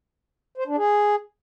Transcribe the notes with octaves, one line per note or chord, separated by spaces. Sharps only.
C5
D4
G#4